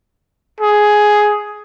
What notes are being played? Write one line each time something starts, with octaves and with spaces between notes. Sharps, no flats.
G#4